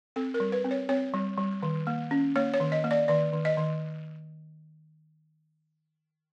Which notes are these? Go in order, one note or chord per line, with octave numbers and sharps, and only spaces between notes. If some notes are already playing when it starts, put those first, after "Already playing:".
C4 A4
A#4
G3
B4
C4
C#5
C4 C#5
G3
G3
D#3
A#3
C#4
A#3 C#5
C#5
D#3
D#5
A#3
D5
D#3 D5
D#3
D#5
D#3